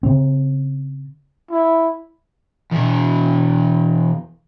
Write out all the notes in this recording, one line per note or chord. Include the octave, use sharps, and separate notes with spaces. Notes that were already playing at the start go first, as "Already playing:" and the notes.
C#3 C4
E4
E2 B2